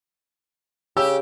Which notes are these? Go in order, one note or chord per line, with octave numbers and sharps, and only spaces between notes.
C#3 G4 E6